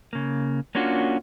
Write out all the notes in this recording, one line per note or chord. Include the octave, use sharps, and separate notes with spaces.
C#3 A#3
A#3 C#4 D4 F4 F#4